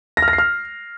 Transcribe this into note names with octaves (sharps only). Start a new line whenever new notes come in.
A#6
F6
A#6
C7
F6